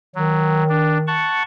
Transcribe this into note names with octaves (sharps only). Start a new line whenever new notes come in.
D#3 F#3
D4
F#5 A5 C#6